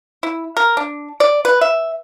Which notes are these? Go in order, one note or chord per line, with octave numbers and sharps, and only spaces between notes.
E4
A#4
D4
D5
B4
E5